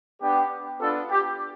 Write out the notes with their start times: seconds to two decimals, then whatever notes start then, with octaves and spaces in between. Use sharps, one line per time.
0.22 B3 D4 G4
0.80 B3 D4 F4 A4
1.10 G4